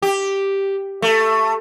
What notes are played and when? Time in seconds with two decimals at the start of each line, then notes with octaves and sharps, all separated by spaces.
0.02 G4
1.02 A3